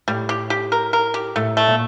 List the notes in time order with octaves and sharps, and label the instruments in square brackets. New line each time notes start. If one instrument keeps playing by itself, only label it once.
[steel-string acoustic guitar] A2 [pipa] G3
[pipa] G4
G4
A#4
A#4
G4
[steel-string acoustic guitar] A2 [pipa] A3
[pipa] A3
[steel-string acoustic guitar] A#2